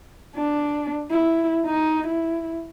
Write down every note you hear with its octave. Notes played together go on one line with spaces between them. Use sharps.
D4
E4
D#4
E4